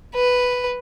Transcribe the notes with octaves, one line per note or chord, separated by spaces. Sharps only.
B4